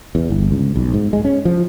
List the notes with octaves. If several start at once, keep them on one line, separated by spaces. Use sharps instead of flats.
E2
G1
C#2
B1
G#2
G#3
C#4
F3